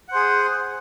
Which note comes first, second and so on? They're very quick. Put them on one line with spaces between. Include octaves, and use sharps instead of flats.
F#5 C5 G#4